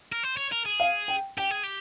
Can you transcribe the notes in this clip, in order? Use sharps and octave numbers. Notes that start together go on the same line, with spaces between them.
A#4
C5
C#5
A#4
G#4
F5
G5
G4 G5
G#4
G4